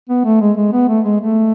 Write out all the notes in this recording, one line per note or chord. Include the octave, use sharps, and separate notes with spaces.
B3
A3
G#3
G#3
B3
A3
G#3
A3